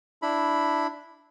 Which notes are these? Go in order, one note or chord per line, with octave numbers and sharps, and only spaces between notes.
D4 E4 B5